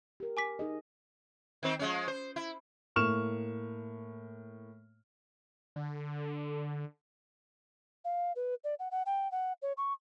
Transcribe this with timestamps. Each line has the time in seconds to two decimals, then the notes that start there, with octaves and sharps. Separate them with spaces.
0.20 G4 A#4
0.37 G#5 D6 B6
0.59 D#4 G#4 D#5
1.63 D#3 C4 C5
1.79 F3 G#3 C#4
2.08 C5
2.36 E4
2.96 A2 A#3 C#6 F6 E7
5.76 D3
8.05 F5
8.36 B4
8.64 D5
8.79 F#5
8.91 F#5
9.06 G5
9.31 F#5
9.62 C#5
9.77 C#6